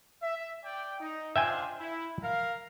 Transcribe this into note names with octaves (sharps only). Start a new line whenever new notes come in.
E5
D5 G5
D#4
D4 F4 C5 E5 G5 G#5
E4
A#4 F5